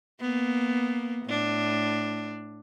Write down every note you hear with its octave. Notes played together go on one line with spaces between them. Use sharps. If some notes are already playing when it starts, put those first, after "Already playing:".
A#3 B3
A2 D4